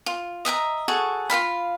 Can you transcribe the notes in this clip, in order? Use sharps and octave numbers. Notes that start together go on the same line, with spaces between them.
F4
D#5 E5 G5 A#5
F#4 G#4 A4 C#5
F4 A4 F5 B5